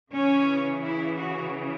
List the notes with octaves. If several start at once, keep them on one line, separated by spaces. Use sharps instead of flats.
C#3 E3 C#4
E4
F#4